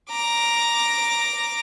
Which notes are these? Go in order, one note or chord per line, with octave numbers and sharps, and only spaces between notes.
A#5 D6